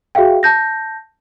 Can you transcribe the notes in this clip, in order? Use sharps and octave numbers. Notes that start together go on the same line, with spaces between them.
F#4 G#4 E5 F5 G5
A5 G6 A#6